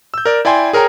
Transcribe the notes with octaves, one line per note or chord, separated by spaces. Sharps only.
E6 G6
A#4 D5
E4 D5 G5 G#5 C6
G#4 A#4 C#5 G5 A#5